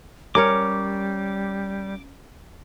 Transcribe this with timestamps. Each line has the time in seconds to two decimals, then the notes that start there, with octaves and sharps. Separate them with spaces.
0.35 G3 C#4 A#4 C#5 D6